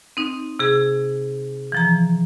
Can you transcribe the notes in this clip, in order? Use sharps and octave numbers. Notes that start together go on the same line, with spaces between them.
C4 D#4
C3 G#4
E3 F3 A#5